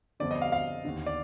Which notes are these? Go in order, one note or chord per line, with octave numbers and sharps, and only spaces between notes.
G1 F2 D3 D5
D#5
F5
F5
D#2 D3
D5